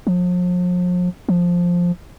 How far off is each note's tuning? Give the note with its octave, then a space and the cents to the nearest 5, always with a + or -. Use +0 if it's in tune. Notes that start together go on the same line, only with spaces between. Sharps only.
F3 +40
F3 +5